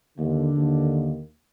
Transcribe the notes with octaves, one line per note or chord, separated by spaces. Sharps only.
D#2 D3
D#2